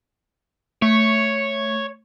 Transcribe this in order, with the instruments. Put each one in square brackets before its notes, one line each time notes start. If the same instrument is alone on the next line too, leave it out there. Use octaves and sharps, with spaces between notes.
[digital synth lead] A3 [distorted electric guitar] C#5